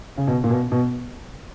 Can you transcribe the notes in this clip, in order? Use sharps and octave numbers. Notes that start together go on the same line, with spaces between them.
C#3
B2
A#2
B2
B2